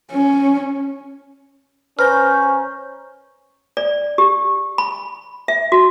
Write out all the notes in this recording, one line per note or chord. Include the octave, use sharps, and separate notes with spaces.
C#4
C#4 B4 C5 A#5 F6 G6
D5
G4
B5
E5
F#4